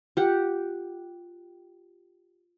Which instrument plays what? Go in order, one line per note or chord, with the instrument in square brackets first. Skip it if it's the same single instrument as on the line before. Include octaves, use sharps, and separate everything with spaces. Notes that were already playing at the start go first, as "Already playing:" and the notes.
[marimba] F4 [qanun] G4 F#5